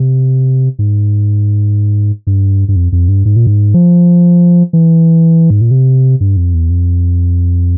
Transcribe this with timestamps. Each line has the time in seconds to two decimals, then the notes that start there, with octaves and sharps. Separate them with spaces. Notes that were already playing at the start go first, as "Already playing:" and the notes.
Already playing: C3
0.79 G#2
2.27 G2
2.68 G2
2.76 F2
2.92 F2
3.08 G2
3.25 G#2
3.36 A#2
3.47 G#2
3.74 F3
4.73 E3
5.50 G#2
5.61 A#2
5.71 C3
6.20 G2
6.37 F2
6.54 E2
6.70 F2